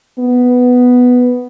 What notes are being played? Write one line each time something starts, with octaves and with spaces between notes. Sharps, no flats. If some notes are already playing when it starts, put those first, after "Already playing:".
B3